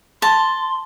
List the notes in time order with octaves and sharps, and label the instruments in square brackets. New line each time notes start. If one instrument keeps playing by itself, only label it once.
[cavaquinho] A5 [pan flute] C6